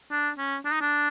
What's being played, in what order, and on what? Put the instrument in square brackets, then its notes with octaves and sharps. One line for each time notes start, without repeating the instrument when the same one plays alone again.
[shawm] D4
C#4
D4
D#4
D4